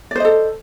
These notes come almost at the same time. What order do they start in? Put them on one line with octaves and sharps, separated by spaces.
D5 C5 D#5 A4